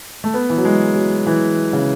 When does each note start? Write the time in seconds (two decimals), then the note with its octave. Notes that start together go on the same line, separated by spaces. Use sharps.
0.24 A3
0.34 B3
0.50 E3
0.58 F#3
0.65 G#3
0.96 F#3
1.27 E3
1.73 C#3